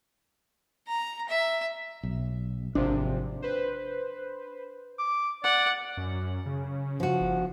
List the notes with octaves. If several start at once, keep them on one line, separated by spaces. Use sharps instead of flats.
A#5
E5
B1
G#1 C3 F3 D4
B4 C5
D6
D5 F#5
F#2
C#3
F3 F#4
G1